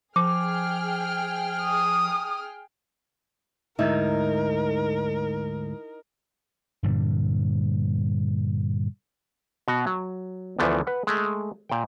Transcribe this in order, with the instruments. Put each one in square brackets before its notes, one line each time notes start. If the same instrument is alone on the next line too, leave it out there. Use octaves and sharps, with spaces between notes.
[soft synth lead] F3 [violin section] G#4 G5 F6 [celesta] D6
[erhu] D#6
[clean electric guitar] D2 G#2 [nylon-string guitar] D#4 E4 E5 [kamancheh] A#4
[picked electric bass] G2 A#2 D3 G3
[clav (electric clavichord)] B2 F#4
F#3
D2 E3 F3 A3 B3
B4 F#5
G#3 A3
A#2 G5